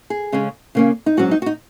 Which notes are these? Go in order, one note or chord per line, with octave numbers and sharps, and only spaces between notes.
G#4
C#3 G#3 C#4
C#3 A#3 C#4
D#4
G#2 F#3 C#4 F#4
D#4
F#4
D#4